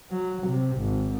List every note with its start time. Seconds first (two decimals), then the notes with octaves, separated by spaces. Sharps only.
0.11 F#3
0.47 C3
0.77 G#1